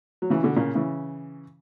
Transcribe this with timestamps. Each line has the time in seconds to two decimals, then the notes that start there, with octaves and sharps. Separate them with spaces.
0.22 F#3
0.30 C#3 E3
0.43 B2 D3
0.56 A#2 C#3
0.75 C#3 E3